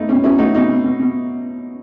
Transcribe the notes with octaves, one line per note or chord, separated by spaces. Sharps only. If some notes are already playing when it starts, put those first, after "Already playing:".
Already playing: A3 B3 D#4
B2 C#4
F#3 C#4 E4
A3 D#4 F#4
B2 D#4 F#4
B2
B2
B2